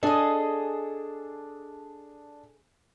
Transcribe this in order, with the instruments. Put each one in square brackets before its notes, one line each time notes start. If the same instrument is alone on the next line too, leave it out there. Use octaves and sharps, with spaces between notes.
[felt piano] D4 [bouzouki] G#4 D#5 [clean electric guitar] A4